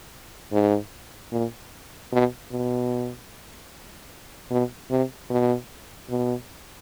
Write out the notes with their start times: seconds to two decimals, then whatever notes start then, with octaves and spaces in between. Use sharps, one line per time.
0.52 G#2
1.32 A#2
2.12 B2
2.52 B2
4.50 B2
4.90 C3
5.30 B2
6.10 B2